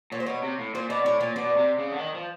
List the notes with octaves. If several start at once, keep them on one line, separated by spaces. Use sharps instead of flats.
A#2 C#5
C5
B2 C#5
C3
A2
A#2 C5
B2 D5
A2 C#5
A#2 C#5
B2 D5
C3
C#3
D3
D#3
F3